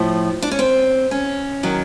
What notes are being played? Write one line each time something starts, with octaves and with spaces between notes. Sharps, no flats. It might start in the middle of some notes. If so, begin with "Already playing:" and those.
Already playing: A2 F3
D4
C#4
C4
C#4
D#3 F#3